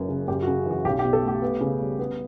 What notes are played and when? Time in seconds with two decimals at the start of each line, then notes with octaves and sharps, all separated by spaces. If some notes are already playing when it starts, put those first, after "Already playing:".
Already playing: F#1 F#2 B4
0.09 C#3
0.28 F#2 G4
0.42 F#4
0.47 C#3
0.66 E3 F#4
0.85 B1 G4
0.99 G4
1.05 B2
1.13 A4
1.23 A3
1.28 G4
1.42 B3
1.61 C#3
1.80 G3
1.99 B3